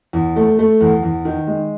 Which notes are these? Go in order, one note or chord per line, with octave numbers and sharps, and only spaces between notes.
E2
A3
A3
E2
E2
D#3
G#3